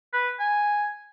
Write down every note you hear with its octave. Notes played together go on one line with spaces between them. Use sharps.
B4
G#5